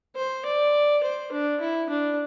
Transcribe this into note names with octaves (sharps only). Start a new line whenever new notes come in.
C5
D5
C5
D4
E4
D4